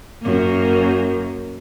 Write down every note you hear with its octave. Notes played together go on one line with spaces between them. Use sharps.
F#2 A#3